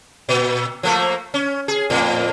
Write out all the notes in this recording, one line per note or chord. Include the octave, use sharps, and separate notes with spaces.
A#2
F3 A3 A#3
C#4
G#4
F2 A2